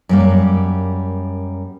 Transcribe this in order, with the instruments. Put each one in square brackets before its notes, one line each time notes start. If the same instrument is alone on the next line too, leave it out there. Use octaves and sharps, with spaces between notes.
[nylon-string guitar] F#2 G3 A#3